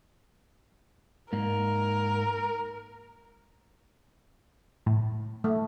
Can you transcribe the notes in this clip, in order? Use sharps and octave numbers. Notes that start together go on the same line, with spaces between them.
G#2 A#3 A#4
A2
A3